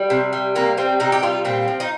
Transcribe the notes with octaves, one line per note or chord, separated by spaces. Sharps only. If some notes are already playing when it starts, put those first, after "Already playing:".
Already playing: G3
C3
G3
C3 A#3
G3 C4
C3 D#4
G4
G3 F4
A#2 C4
F3
D#4